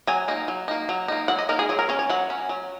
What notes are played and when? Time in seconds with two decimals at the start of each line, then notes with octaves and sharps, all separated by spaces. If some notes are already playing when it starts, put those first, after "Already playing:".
0.07 F#3 G#5
0.28 A#3 D#4
0.48 F#3
0.68 A#3 D#4
0.89 F#3
1.08 A#3 D#4
1.28 F#3 F#5
1.39 D#5
1.49 A#3 D#4 A#4
1.59 G#4
1.69 F#3 G#4
1.79 A#4
1.89 C#4 C#5
1.99 C#5
2.10 F#3 F#5
2.30 C#4
2.49 F#3